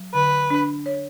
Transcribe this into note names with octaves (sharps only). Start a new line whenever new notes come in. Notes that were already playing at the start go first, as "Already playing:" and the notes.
Already playing: F#3
D3 B4
D4
C#5